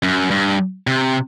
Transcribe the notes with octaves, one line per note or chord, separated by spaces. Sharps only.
F#2
G2
C3